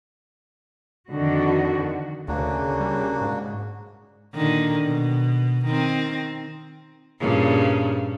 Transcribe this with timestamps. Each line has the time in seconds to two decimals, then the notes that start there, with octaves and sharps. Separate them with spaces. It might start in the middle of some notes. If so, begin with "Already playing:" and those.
1.10 F2 D3 D#3 F#4
2.28 D2 C#3 A#3 D4 F#4
2.80 G3
3.21 G#2
4.34 A#2 D3 D#3
4.83 B2
5.66 D#3 C4
7.20 G2 A#2 C#3